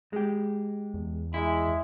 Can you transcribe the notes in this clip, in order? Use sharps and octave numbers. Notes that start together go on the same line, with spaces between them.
G#3 G4
E2
G#3 E4